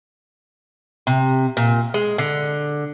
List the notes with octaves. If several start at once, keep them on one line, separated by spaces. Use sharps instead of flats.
C3
A#2
G#3
D3